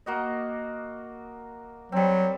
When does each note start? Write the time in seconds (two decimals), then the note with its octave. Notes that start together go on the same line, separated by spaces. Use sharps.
0.06 A#3 F#4 D#5
1.92 F#3 G3 C4